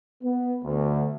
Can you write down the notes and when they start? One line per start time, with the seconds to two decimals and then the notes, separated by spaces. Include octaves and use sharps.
0.23 B3
0.64 D2